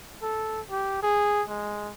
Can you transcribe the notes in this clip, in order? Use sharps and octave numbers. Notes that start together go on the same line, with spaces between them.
A4
G4
G#4
G#3